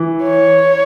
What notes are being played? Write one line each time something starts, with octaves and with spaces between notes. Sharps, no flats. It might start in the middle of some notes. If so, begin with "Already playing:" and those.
Already playing: E3
C#5